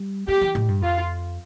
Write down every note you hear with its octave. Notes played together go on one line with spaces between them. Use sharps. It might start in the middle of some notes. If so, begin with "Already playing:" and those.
Already playing: G3
A3 G4
E3
A2
G2
F2 F4